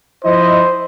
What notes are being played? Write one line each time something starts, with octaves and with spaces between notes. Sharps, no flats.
F3 E4 C5 D#5